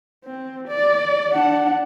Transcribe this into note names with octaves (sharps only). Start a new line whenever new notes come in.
C4
D5
D4 F#5